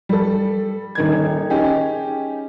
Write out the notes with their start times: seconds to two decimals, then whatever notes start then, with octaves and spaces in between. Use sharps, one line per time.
0.09 G3 A4
0.95 D#1 D#3 G#6
1.50 C#4 D#4 G4 G#4